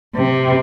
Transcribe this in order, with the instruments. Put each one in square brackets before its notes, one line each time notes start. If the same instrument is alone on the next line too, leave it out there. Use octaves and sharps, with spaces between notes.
[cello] C3